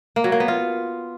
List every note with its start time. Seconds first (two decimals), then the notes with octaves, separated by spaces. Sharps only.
0.16 A#3
0.24 F#3
0.32 A#3
0.40 B3
0.48 F4